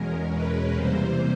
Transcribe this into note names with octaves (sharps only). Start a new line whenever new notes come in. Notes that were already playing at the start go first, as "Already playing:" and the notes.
Already playing: E2 B2 G#3 C#4 A#4
B4
C3 E3 G3 A#3 C5